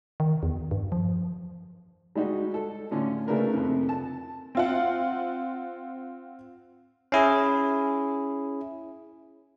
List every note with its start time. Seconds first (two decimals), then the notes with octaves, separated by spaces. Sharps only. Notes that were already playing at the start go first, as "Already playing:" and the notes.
0.20 D#3
0.43 E2
0.71 G2
0.92 F3
2.16 G3 G#3 D#4 F#4
2.54 A4
2.91 A2 D3 C#4 F4
3.27 C#3 A3 A#3 D4 A#4 B4
3.54 F2 C3
3.89 A5
4.55 C4 F4 F#5
7.12 C#4 E4 G#4